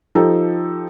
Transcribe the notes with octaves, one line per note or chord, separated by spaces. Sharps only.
F3 D#4 G4 A4